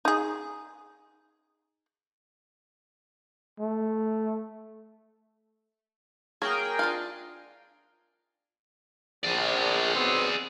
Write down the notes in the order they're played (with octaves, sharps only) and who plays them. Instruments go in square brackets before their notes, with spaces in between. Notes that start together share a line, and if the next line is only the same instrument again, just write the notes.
[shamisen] D#4 G#4
[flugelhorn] A3
[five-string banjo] F#3 A#3 [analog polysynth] G#4 A#4 G5
[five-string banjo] D4 F4 F5
[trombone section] A#1 [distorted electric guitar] G#4 D5
[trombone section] B1 B3 C4